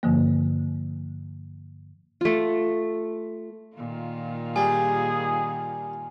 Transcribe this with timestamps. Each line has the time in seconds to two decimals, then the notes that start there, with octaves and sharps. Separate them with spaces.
0.03 G2 D3 F3 A#3
2.21 A3 F4
3.76 A#2 D#3 F4
4.56 G3 G#4 G#5